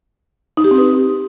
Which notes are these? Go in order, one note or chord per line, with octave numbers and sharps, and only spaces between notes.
D#4
G4
C4
B4